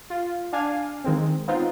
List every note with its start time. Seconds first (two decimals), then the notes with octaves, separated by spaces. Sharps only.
0.10 F4
0.53 D4 F5 G#5
1.04 D#3 G#3 C4
1.48 B3 C4 D#4 F4